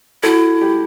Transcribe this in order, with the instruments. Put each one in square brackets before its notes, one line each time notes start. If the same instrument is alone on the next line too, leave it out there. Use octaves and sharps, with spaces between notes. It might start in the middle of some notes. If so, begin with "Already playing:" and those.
[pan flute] E4 [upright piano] F#4 A4
[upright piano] G4